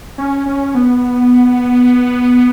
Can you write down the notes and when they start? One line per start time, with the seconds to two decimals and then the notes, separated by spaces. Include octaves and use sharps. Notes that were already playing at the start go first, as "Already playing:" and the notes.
0.18 C#4
0.46 C#4
0.75 B3